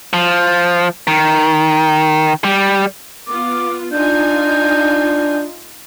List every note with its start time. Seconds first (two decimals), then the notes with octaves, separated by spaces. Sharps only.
0.13 F3
1.07 D#3
2.44 G3
3.27 B3 F4 D6
3.92 D4 D#4 F4 G#5 G6